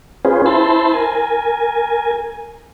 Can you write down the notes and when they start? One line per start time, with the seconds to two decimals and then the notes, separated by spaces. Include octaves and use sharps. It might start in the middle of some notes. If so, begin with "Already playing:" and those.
0.25 C#4 F4 G#4 B4 C5
0.46 E4 C5 A5 B5 C6
0.93 A#4 G#5